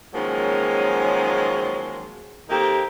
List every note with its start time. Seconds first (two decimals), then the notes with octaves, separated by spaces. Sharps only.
0.14 D#3 F3 F#3 G#3 A#3 C#4
2.50 D#3 A#3 C4 D#4 G4 A4